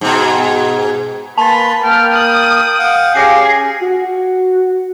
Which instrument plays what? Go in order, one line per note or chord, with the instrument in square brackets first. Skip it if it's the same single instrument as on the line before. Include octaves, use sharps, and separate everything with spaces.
[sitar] G#2 B2
[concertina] A#3 G#5 C6 [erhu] B4 [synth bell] A5 A6
[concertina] A#3 [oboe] G5 [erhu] F6
[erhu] D#6 [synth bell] F6 F#7
[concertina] F5 F#5
[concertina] C#4 G4 [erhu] G#4 [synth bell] F5 A#6 C7
[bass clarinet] F#4